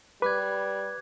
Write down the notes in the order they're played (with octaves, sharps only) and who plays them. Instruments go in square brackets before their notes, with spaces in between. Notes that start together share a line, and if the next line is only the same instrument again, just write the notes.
[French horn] G3 [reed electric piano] B4 [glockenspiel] D6 F#6 G#6